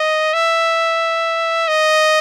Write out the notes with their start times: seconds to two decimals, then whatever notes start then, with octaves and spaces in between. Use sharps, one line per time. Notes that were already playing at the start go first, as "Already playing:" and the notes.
Already playing: D#5
0.33 E5
1.68 D#5